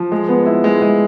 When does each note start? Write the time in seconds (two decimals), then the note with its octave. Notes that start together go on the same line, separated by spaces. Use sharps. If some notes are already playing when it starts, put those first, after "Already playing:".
Already playing: F3
0.12 G#3
0.29 B3
0.46 E4
0.64 G#3
0.82 G#3